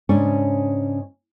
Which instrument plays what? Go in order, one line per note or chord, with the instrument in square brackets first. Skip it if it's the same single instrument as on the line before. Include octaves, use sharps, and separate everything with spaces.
[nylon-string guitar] G#2 C#3 C#4 D4 C#5